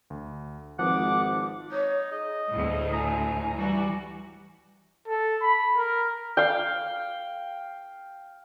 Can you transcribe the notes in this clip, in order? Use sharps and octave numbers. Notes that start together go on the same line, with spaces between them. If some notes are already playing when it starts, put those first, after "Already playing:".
D2
G#1 F3 B4 F#5 D6
D#4 C#5
G#4 D#5
D2 A2
G#5 A#5
E3 G3 F#4
A4
B5
A#4
F5 G5